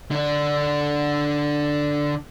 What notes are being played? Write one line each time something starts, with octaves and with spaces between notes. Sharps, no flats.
D3 D4